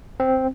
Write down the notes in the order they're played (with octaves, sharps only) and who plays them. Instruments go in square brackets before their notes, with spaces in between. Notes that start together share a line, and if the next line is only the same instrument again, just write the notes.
[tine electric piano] C4